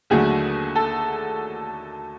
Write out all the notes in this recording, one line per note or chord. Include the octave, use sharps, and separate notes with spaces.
D#2 D3 F#3 A3 G#4
A4